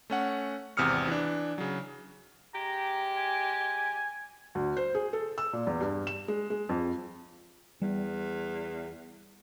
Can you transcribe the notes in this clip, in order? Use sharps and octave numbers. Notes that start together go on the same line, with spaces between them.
A3 C#4 F#5
G#1 E2 C3 D#6 F6 C#7
E3 D4
C#3 F#3
G#3 G4 A#5
G#5
D2
C5
G#4
A4
E6
A#2
E2
G2
E7
G#3
G#3
F2
E2 G3